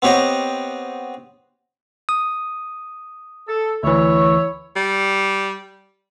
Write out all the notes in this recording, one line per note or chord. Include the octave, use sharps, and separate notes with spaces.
B3 C4 G4 C#5 D#5 F#5
D#6
A4
D2 E3 E4 C#5
G3